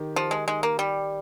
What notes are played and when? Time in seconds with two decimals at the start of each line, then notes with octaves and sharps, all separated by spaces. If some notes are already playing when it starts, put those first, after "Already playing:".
Already playing: D#3 G4
0.16 F3 G4
0.31 G#3
0.47 D#3 G#3
0.63 A#3
0.78 G3 G4